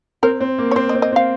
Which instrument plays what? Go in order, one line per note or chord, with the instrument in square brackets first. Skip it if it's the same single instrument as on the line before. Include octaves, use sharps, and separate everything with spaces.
[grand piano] C4 [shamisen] A#4
[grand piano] C4
A#3
[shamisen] C#5
[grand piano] C4 [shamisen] C5
[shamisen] D#5
[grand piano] C4
[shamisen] D#5
[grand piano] C4
[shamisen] F5